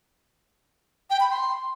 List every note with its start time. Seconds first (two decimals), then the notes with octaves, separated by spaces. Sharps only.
1.10 G5
1.20 B5
1.30 C6